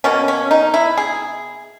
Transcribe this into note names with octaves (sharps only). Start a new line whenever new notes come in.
B2 A#3 C#4
C#4
D#4
E4
G#4